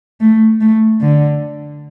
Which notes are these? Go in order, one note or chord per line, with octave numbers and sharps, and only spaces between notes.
A3
A3
D3